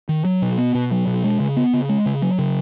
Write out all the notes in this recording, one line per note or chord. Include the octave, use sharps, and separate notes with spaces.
D#3
F#3
B2
B3
B2
F#3
B2
G#3
C#3
B3
C#3
G#3
C#3
F#3
C#3